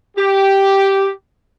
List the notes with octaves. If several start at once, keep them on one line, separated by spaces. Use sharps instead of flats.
G4